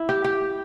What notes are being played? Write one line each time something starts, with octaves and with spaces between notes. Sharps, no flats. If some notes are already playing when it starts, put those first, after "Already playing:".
Already playing: E4
G4
G4